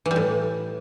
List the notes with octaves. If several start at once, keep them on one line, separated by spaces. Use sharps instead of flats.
E3
G3
A2